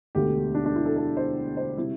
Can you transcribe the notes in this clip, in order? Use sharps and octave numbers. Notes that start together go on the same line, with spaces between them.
E1 D2 D3 A3 G4
D4
D4
E4
A4
A4
C5
C5
C3 G3 E4